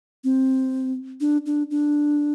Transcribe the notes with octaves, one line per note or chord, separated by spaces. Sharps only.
C4
D4
D4
D4